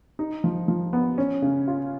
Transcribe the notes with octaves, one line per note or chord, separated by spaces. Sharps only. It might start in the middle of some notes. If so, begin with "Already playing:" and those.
D#4
F3
F3
B3
C#4
C#3
F4